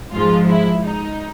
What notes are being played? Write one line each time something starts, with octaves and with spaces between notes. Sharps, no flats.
G#2 F3 G#3 F4
E4
D#4